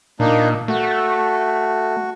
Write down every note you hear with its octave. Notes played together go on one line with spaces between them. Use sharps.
A#2 A#3 D4 D#4
A3 F#4